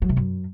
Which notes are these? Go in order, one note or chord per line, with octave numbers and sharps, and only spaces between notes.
F#3
C3
F#2